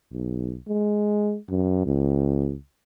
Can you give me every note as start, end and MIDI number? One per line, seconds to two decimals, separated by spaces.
0.12 0.57 35
0.68 1.37 56
1.49 1.83 42
1.86 2.56 37